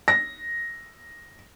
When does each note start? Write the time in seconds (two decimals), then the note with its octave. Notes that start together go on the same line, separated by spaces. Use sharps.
0.08 A#6